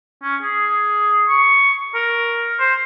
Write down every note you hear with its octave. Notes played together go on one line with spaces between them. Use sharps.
C#4
G#4
C#6
A#4
C5